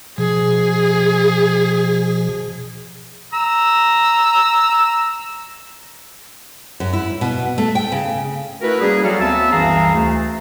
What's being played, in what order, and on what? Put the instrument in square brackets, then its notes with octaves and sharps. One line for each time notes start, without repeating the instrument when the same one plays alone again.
[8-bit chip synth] B2 F3 [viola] G#4
[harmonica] A#5 E6
[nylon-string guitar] F#2
E4
B2
A3
G5
C#3
[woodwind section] A3 E4 F#4 A#4 B4
G3 A#3 C#4 G#4
F#3 C#4 F#4 A4 F5
D2 B3 C4 E5 A5 E6
C2 F#2 E3 G#4 F5 A#5
D2 A3